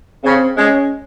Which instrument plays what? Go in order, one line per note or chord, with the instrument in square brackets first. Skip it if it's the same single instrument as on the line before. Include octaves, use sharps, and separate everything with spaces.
[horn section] C#3 [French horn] C4
[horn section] G#3 [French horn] C#4